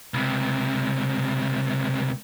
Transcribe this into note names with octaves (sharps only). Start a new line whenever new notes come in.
C#2 C3